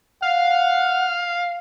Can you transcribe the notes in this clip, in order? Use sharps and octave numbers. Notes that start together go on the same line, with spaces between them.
F5 F#5